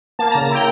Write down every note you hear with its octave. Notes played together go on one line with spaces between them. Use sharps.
A#3 A5
A#5
C#3
E4 G5